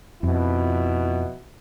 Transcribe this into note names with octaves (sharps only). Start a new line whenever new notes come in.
F2 B2 E4